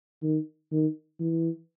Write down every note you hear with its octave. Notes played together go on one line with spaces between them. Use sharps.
D#3
D#3
E3